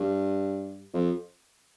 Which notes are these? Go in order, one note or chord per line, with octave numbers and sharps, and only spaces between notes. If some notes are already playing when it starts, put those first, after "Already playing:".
Already playing: G2
F2